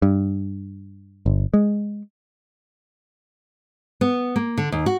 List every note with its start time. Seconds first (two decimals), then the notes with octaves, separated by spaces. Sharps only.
0.02 G2
1.26 G1
1.54 G#3
4.01 B3
4.36 A#3
4.58 D3
4.72 D#2
4.86 F#4